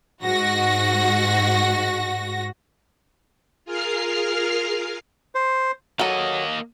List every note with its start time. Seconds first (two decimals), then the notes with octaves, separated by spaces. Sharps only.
0.23 G#2 F#4 A#6
3.65 F4 G#4 A#4 F5 F6 C7
5.35 C5
5.99 F#3 A#3 A4 D#5